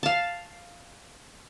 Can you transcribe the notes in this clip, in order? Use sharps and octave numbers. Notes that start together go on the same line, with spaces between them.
F5 A5